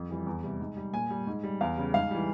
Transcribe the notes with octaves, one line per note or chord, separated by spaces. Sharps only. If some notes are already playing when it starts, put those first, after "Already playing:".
Already playing: F2
E3 G3
E2
C3 G3
G#2
G3
A#2 G#5
G3
G#2
G3
E2 F5
C#3 G3
G#2 F5
E3 G3